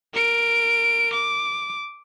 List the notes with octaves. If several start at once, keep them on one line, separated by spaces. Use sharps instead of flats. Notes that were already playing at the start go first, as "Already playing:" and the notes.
A#4 D7
D6